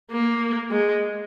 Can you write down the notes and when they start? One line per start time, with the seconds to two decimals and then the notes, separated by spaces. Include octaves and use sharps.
0.11 A#3
0.71 G#3